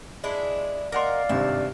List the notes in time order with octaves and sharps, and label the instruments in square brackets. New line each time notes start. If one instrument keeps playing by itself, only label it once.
[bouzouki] G#3 D4 E4
[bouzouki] A#4 [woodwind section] D5 F5 [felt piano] D#5 F#5 C6
[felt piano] G#1 G2 C3 [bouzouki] E5